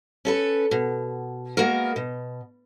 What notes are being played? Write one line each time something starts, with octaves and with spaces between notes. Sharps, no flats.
C#4 A4 B4
B2
G#3 A#3 B3 F#4 A#4
B2